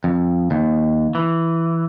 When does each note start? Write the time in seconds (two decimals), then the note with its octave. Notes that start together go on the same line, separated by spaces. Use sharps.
0.04 F2
0.51 D#2
1.15 E3